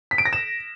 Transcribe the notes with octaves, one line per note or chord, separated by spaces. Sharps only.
B6
D7
A#6
E7